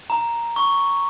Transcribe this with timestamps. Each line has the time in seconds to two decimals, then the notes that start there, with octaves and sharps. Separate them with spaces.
0.10 A#5
0.56 C#6